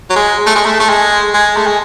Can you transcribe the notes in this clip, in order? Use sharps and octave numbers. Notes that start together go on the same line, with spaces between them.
F#3
G#3
A3
G#3
A3
A3
G#3
G#3
A3
G#3